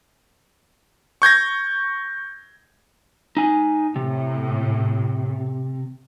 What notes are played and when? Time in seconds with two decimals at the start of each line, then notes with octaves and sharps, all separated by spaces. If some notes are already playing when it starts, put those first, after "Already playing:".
1.22 C#6 G6 G#6 A#6
3.37 D#4 G#5
3.96 A2 C3